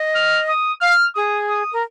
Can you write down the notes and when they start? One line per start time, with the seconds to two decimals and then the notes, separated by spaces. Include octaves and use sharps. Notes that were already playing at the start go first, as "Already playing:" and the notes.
Already playing: D#5
0.15 F6
0.48 D#6
0.81 F5 F6
1.15 G#4 D#6
1.49 D#6
1.73 A#4